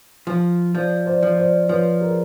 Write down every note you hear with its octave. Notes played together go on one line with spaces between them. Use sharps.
F3
F3 C5 D5
C5 D5
F3
C5 D5
F3 B4 C#5
G#4 A#4